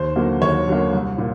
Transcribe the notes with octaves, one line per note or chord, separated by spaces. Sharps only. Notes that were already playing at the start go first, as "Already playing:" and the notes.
Already playing: D#2 C5
D3 F#3 A#3
D#2 C#5
D3 F#3 A#3
C2
A#2